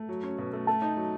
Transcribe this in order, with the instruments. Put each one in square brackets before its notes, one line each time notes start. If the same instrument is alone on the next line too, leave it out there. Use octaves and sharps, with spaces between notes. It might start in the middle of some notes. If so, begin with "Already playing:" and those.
Already playing: [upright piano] A3
F#3
C#4
B2
A3
[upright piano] A3 [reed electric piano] A5
[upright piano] D#4
F#3